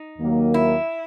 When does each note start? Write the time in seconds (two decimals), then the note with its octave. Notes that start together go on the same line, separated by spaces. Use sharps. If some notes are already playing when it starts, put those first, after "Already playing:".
Already playing: D#4
0.18 D#2 D#3 F#3 A#3
0.54 E4